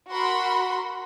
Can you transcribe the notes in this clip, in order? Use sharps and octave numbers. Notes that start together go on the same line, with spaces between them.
F#4 A#4 F#5 B5 C6